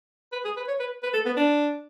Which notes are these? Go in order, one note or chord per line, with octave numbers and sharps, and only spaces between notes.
B4
G#4
B4
C#5
B4
B4
A4
B3
D4